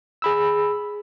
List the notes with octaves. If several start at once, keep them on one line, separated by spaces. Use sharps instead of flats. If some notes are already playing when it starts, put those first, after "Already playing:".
G#4 B5 E6